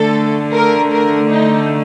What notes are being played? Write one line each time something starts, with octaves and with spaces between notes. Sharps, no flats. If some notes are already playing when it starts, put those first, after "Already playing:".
Already playing: D3 A3 A4
A#4
A#4
D#4